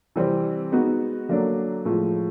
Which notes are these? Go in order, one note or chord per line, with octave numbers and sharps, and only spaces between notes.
C3 E3 G3 C4
G#3 B3 D#4 F#4
D3 F#3 A#3 D4
A2 F3 G#3